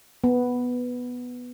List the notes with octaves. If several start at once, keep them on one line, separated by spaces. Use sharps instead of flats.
B3